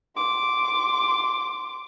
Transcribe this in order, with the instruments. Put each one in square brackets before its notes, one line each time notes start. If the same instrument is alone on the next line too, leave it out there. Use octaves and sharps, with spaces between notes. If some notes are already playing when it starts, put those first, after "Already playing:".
[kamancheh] C6 D6